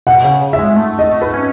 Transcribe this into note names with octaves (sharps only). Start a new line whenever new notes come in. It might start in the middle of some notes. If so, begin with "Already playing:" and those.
B2 F#5
C#3
C#3
E5
G#3
A3
D#5
B4
C#4